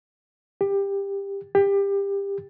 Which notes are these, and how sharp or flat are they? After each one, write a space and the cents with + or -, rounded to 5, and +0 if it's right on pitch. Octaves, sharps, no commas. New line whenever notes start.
G4 +20
G4 +25